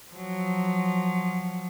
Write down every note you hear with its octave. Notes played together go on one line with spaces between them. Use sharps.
F3 F#3